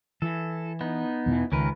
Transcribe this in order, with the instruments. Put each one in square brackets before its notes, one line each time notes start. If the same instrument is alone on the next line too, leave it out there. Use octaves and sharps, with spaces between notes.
[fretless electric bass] E3 [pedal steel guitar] A4
[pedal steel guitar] B3 D#4
[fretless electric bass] E2 B2 E3
[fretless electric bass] C#2 D#3 [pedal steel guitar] C#4 A#4 B4